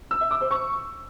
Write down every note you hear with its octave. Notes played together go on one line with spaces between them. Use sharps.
E6
E5
D6
C5
C#6